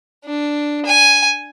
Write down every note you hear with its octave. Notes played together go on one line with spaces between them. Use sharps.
D4
G#5